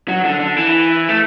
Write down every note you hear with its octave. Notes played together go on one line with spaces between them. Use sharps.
F#3
D3
D3
E3
A3